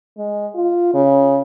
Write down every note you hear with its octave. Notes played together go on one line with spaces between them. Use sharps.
G#3
F4
C#3